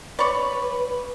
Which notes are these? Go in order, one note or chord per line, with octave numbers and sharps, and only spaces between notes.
B4 C#5 D5 B5 C#6